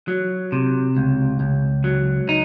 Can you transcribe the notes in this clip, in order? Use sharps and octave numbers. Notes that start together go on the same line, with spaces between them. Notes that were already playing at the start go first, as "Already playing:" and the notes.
F#3
C3
C#2
C#2
F#3
D#4